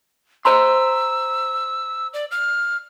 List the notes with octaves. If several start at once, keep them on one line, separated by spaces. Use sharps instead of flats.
C5 A#5 C6 E6
D5
F6